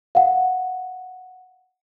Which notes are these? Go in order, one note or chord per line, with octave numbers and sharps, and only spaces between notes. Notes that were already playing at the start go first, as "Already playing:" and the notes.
F5 F#5